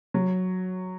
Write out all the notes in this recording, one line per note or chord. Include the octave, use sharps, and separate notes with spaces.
F#3